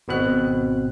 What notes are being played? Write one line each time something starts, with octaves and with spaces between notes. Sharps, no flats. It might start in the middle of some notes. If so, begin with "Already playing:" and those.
G#1 B2 C4 F#6